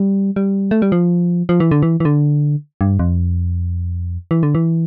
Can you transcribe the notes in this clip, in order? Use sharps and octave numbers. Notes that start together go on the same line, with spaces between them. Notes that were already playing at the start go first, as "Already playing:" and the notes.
Already playing: G3
G3
A3
G3
F3
F3
E3
D3
E3
E3
D3
G2
F2
E3
D3
E3